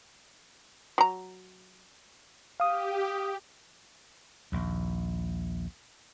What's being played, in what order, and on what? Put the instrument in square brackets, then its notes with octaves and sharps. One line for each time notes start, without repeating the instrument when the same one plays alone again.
[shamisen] F#3 A#5
[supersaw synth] G4 [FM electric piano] F5 D#6
[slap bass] A#1 D#2